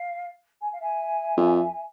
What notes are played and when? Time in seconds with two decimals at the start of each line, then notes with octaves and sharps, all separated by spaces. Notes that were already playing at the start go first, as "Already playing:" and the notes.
Already playing: F5
0.61 G#5
0.70 F5
0.80 E5 G#5
1.37 F2